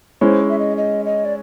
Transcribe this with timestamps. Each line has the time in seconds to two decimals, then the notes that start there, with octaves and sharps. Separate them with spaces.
0.21 G#3 C#4 E4 C5
0.49 E5
0.59 D#5
0.77 D#5
1.05 D#5
1.25 D5